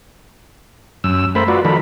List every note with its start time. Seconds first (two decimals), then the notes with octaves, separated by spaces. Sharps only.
1.04 F#2 E6
1.35 A3 A#4 C5 B5
1.48 F4 F#4 B4 D5
1.65 D#3 F3 A4 A#4 B5